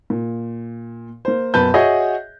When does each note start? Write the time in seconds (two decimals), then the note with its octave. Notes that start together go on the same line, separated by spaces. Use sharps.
0.10 A#2
1.25 A#3 C5
1.54 F#2 B2 B4 A5 G6
1.74 F#4 G#4 C#5 D#5 E5